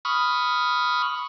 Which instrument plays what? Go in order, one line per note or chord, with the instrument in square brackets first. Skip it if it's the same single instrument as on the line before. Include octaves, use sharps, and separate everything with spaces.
[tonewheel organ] B5 C#6 D#6 F6